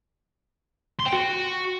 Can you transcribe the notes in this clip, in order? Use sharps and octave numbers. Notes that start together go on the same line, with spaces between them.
C6
G5
F#4